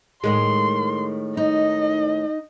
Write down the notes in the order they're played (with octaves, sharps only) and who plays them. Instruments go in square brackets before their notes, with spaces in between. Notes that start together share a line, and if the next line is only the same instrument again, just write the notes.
[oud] A2 D#3 G#3 [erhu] C6
[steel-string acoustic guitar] D#4 [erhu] D#5